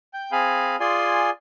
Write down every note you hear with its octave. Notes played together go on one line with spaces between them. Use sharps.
G5 G6
C4 G#4 F5 G#5 B5
F4 G#4 D5 G#5 C6